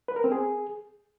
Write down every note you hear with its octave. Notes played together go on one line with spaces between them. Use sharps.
B4
A#4
C4
G#4